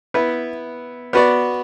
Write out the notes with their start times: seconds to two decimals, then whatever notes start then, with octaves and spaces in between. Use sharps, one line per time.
0.14 B3 E4 B4
1.13 B3 F#4 B4 D5